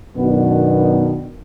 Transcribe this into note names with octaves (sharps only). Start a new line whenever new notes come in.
F#2 B2 D#3 B3 D4